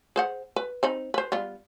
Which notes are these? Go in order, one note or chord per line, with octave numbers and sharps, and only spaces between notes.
G#4 C5 F#5
B4
C4 D#4 B5
B4 C5
G3 B3 F4